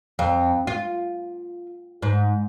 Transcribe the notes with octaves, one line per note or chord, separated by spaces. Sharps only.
F2
F4
G#2